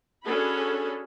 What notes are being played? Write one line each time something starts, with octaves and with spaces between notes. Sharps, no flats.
C#4 D4 F#4 G#4 A4 B5